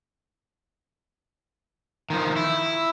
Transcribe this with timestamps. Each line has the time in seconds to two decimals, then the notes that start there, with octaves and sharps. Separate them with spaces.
2.10 D#3 F3
2.37 E4